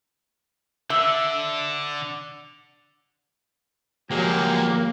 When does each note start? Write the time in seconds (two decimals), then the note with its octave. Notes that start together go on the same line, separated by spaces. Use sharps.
0.90 D3 E5
4.11 F3 F#3 G#3 A#3 G4 G#4